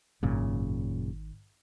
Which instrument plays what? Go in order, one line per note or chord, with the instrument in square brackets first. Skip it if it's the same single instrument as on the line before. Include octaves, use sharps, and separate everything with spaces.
[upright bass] G#1 [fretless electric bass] F#2 A#2 C#3